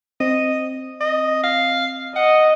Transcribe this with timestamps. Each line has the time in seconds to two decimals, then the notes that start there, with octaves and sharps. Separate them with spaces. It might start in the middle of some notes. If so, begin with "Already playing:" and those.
0.20 C4 D#5
1.00 D#5
1.44 F5
2.16 D#5 F#5